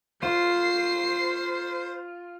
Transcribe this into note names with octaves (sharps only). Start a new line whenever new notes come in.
F4 C5 C7